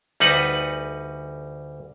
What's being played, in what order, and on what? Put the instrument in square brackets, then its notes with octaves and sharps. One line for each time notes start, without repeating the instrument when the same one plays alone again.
[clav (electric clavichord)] D2 G3 D#4 B4 F#5